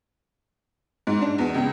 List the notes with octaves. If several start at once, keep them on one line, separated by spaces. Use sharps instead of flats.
G#2
D4
E2
C#2